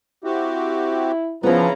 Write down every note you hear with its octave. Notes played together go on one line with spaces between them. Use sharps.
C4 E4 F#4 G4
C#3 F3 B3 C#4 E4 A#5